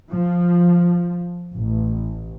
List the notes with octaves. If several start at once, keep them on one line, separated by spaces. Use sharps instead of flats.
F3
A1